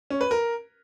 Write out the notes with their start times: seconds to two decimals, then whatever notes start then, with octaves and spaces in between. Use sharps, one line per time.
0.10 C#4
0.21 B4
0.31 A#4